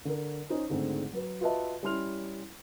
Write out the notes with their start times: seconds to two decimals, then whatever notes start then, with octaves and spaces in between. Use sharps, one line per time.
0.05 D3 A#4
0.49 C#4 D#4 C5
0.69 C#2 G#2 D3 A3 C4
1.13 F#3 B4
1.41 F4 F#4 B4 D#5 E5 A5
1.83 G3 C#4 E4 C6 F6 F7